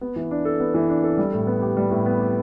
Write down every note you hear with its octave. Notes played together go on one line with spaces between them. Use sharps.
B3
E3
D4
A4
B3
E3
D4
A4
G3
A2
B3
G4
G3
A2
B3
G4